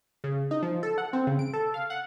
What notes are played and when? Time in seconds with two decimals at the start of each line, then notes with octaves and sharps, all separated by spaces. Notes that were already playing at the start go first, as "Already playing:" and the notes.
0.24 C#3
0.51 D#4
0.63 F3
0.83 A4
0.98 F#5
1.13 C4
1.27 C#3
1.39 D7
1.54 A4
1.74 F5
1.90 F#5